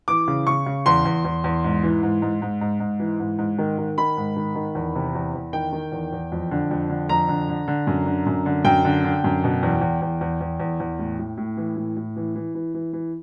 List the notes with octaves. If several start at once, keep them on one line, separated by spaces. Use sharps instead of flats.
E3 D6
C#3
C#3 C#6
C#3
E2 C6
E2
E2
E2
G#2
E3
G#2
G#2
G#2
G#2
G#2
E3
G#2
G#2
D#3
D#3
D#3 B5
G#2
D#3
D#3
E2
C3
E2
E2
D#3 G5
D#3
E2
E2
F2
D3
F2
D3
F2 A#5
D3
D3
D3
F#2
D3
F#2
D3
F#2 G5
D3
D3
F#2
B2
E2
E2
E2
E2
E2
E2
E2
A2
A2
A2
E3
A2
A2
E3
E3
E3
E3
E3